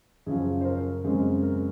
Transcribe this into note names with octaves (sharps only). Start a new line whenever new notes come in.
F#2 C#3 F3 G#4
C5
A#4
F#2 C#3 G#3 C4
A#4